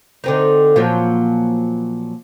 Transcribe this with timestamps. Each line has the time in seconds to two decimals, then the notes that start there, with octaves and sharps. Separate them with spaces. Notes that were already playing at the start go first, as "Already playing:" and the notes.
0.24 D3 C4 D#4
0.76 A#2 F3 F#3